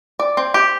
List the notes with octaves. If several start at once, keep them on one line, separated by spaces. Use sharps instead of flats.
D5
C4
G4